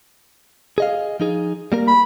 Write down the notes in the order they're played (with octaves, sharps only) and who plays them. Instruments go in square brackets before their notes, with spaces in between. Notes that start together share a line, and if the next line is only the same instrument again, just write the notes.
[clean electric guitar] G#4 D#5 F5
F3 D#4 G#4
G3 A#3 A#4
[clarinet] B5